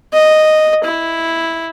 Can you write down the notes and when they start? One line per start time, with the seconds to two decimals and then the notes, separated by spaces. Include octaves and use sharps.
0.13 D#5
0.84 E4